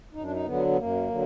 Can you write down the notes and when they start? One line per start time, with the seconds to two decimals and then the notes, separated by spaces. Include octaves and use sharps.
0.14 F#2 D#4
0.23 D4
0.32 D#4
0.45 D3 F#3 B3
0.67 B3
0.77 F#2 A#3
1.09 D3 F#3